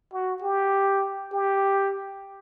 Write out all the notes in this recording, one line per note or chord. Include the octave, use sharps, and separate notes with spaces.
F#4
G4
G4